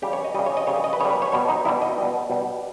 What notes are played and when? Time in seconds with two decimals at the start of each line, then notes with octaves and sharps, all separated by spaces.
0.02 C#3 G3 G4
0.13 C#5
0.24 D#5
0.34 G3 D#5
0.38 C#3
0.46 C#5
0.57 D#5
0.67 C#3 G3 C#5
0.84 D#5
0.93 B4
1.00 C#3 C#5
1.05 G3
1.10 B4
1.22 C#5
1.32 B2 G3 C#5
1.49 D#4
1.65 B2 G3 E4
1.82 D#5
1.98 B2 G3
2.30 B2 G3